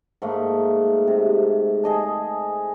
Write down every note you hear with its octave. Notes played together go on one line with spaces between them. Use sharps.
G#2 A3 A#3
C3
G#4 D#5 A5